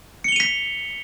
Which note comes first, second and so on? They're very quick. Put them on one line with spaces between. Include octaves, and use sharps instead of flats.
C#7 G7 F7 D#7 B6